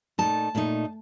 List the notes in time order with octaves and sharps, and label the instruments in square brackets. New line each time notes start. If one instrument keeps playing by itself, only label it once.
[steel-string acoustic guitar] A#2 A3 D#4 A5
A#2 A3 D#4